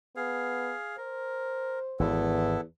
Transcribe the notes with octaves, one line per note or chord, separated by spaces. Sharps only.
B3 G#4 F5
A#4 C5
G#1 E2 B3 E4 A4